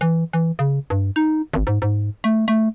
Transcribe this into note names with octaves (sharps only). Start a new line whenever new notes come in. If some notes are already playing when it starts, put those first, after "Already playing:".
E3
E3
C#3
G2
D#4
G#1
G#2
G#2
A3
A3